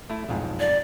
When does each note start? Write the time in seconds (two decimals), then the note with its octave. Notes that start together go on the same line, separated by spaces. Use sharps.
0.10 A3 E4
0.29 B1 F2 G#2
0.60 D5